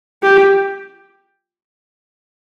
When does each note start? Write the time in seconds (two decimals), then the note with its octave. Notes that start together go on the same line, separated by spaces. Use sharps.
0.23 G4